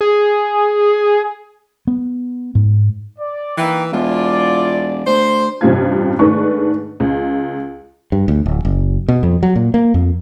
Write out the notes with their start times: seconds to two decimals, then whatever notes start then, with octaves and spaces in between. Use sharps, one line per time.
0.01 G#4
1.87 B3
2.55 G#2
3.18 D5
3.57 E3 A#3 D#4 G5
3.92 E1 E4 F4 D5
5.06 D2 C5
5.61 A1 G2 C3 C4 F4 G#6
6.19 G#2 D#3 A3 D4 B4 C#6
7.00 C#2
8.12 G2
8.28 D2
8.46 D1
8.65 F#1
9.08 B2
9.23 F2
9.43 F#3
9.56 A#2
9.74 A#3
9.94 F2